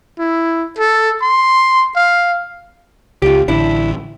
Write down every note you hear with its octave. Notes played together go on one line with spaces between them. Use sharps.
E4
A4
C6
F5
C#2 F4 G4
A1 D3 D4 E4